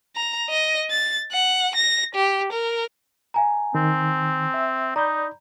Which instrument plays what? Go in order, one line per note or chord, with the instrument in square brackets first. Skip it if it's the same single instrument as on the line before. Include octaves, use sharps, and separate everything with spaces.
[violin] A#5
D#5
A6
F#5
A#6
G4
A#4
[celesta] F5 G#5 A#5
[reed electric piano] D#3 [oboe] C4
[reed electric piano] E5
[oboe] D#4 [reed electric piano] D5 B5 G6 [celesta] A#5